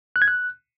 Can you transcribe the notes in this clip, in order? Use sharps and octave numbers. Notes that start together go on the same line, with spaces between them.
F#6
G#6
F#6